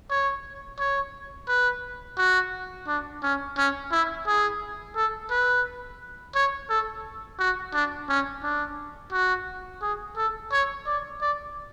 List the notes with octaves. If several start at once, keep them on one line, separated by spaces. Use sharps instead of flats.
C#5
C#5
B4
F#4
D4
C#4
C#4
E4
G#4
A4
B4
C#5
A4
F#4
D4
C#4
D4
F#4
G#4
A4
C#5
D5
D5